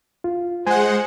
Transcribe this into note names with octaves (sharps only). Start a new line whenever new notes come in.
F4
G#3 C5 F#5 G#5